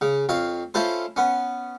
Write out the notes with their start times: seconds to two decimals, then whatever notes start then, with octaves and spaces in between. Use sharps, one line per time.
0.01 C#3
0.29 F2 C#5 F5
0.74 C#4 E4 F4 A4 C5
1.16 B3 C#4